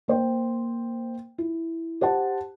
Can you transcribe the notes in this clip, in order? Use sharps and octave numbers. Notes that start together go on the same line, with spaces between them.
A#3 C5 G5
E4
G4 C5 F#5 A5